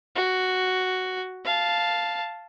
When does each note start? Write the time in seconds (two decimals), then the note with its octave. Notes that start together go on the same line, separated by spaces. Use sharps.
0.16 F#4
1.45 F5 A5